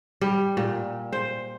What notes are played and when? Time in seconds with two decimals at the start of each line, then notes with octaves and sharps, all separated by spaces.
0.21 G3
0.57 A#2
1.13 C5